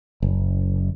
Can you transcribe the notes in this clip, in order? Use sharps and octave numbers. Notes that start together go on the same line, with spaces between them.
F#1